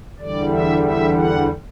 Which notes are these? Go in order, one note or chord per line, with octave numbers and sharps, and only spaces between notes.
E2 D3 G3 D5
E5
E5
F#5